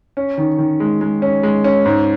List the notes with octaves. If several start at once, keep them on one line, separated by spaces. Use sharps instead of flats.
C#4
D#3
D#3
G#3
G#3
C#4
G#3
C#4
G#2